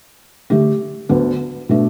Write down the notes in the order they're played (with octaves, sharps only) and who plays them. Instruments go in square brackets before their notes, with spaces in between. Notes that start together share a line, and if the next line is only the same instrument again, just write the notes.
[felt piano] D3 A3 D4 G4
D2 D3 B3
B2 A3 D4